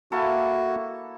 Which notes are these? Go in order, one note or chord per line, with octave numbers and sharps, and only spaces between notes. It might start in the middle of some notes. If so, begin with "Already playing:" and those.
A#3 E4 F#4 A4